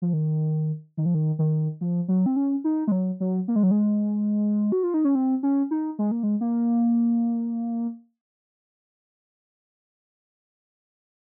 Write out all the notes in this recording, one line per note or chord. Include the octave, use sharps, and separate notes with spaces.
F3
D#3
D#3
F3
D#3
D#3
F3
F#3
C4
C#4
D#4
G#3
F#3
F#3
A#3
G#3
F#3
G#3
F#4
F4
D#4
C#4
C4
C#4
D#4
G#3
A#3
G#3
A#3